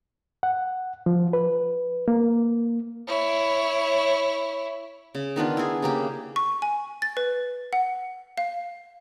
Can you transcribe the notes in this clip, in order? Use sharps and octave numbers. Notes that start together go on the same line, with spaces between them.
F#5
F3
B4
A#3
E4 C#5
C#3
D#3 B3 D4 F4
E4 G#4
C#3 A#3 G4
C#6
G#5
A6
B4
F#5
F5